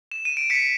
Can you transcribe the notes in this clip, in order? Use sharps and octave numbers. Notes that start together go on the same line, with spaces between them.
E7
D#7
D7
B6 C#7